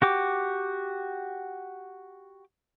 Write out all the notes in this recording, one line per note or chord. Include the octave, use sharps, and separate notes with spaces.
F#4 G4 D6